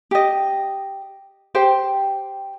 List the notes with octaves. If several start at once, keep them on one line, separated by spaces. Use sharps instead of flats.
G4 D#5
G4 C5 G5